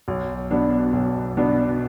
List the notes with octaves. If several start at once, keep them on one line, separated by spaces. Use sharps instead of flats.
B1
B2 B3 D4
B1
B2 B3 D4